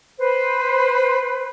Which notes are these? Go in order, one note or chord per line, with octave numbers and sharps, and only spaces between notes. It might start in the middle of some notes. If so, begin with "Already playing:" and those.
B4 C5